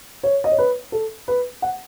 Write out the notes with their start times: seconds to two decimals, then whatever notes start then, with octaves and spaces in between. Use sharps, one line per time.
0.23 C#5
0.44 D#5
0.52 C#5
0.58 B4
0.92 A4
1.28 B4
1.62 F#5